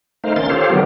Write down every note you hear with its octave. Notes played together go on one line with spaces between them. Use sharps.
A3 D#4 A#4 C5 F5
D#3 A#3 C#4 A#4 C6 A6
F4 G4 A4 C5 C#5 F5
D3 D#3 F#3 B3 G4 A#4